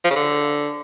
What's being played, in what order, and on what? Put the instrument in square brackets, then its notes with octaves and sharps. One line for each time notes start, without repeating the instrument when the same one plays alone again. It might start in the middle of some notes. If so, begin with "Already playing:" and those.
[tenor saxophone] F3
C#3
D3